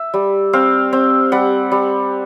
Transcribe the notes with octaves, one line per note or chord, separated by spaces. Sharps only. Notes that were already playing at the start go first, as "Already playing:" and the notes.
Already playing: E5
G3
C4 F5
C4
G3 F#5
G3